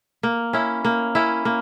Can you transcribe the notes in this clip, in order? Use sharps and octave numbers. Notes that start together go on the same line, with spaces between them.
A#3
C#4 E4
A#3
C#4 E4
A#3